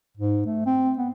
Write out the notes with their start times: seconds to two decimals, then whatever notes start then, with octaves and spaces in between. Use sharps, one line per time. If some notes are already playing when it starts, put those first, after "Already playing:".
0.17 G#2
0.46 A3
0.66 C4
0.98 B3